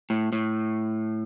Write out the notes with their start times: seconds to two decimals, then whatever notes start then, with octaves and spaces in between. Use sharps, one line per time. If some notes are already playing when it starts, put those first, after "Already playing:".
0.10 A2
0.32 A2